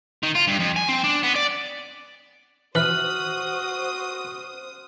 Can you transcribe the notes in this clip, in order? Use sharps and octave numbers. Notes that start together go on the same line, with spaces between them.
D#3
F4
G2
F2
G#5
C4
D4
B3
D5
E3 F#4 C5 D#6 F6 F#6 F#7